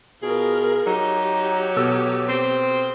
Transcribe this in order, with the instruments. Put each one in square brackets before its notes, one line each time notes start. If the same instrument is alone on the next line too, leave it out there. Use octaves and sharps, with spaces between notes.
[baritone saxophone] B2 [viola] F4 A#4 [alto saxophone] G#4
[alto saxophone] F#3 [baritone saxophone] D#4 [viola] G4
[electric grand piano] B2 A4 E6
[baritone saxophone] C4